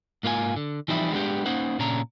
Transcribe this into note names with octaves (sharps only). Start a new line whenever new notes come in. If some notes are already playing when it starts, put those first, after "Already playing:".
G#2 A#3 F4 B4 G#5
D3
E3 F3 G3 C4 D#4 E4
G#3 B3 D4 G4
A#3 C#4 D#4 C5 F#5
A#2 C#3 C#4 D4 A#5